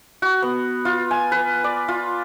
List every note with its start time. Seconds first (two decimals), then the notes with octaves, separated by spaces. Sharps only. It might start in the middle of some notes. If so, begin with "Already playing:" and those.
0.22 F#4
0.42 B3
0.85 F4
1.11 G#5
1.32 B4
1.64 D5
1.88 F4